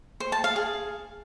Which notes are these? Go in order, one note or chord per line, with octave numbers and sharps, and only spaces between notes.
C5
A5
F5
G#4